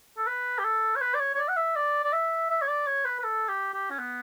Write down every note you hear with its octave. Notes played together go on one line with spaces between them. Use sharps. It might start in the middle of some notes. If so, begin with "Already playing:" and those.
A4
B4
G4
A4
C#5
B4
D5
C#5
C#5
D5
F#5
E5
D5
D5
E5
E5
C#5
D5
C#5
B4
B4
A4
G4
G4
C#4
B3